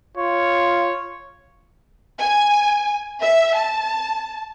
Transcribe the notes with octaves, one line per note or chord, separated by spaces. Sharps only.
F4 C#5
G#5
E5
A5